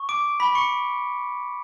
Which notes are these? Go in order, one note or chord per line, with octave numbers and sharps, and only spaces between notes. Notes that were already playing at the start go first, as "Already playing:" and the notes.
Already playing: C#6
D6 D7
B5 B6
C#6 C#7